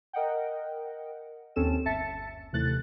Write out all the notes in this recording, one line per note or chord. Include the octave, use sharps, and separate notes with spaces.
A#4 D#5 F#5 G5
D#2 C4 C#4 A4 E7
G1 E5 A5 A6 C#7
D#2 C3 E3 A3 F#6 A6